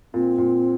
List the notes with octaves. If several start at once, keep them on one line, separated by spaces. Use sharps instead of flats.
A#2 C4
A#2